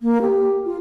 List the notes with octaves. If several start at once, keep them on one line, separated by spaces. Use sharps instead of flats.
A#3
G4
F4